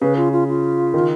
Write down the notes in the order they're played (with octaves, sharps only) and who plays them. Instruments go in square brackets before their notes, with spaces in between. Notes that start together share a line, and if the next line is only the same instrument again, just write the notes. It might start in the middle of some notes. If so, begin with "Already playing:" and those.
[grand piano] C#3 [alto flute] B4
[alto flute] F4
F4
F4
[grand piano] D#3